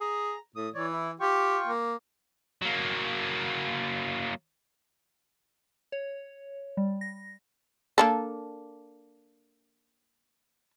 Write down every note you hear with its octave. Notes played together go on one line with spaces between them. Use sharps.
G#4 A#5
A2 D#6
E3 C#5 D5
E4
F4 G4 G5 C#6
A#3
F#3 A#3
C#5
G3
A#6
A#3 D4 A4